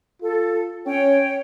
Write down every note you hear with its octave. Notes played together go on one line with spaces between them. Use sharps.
F4 A4
C#4 C#5 G5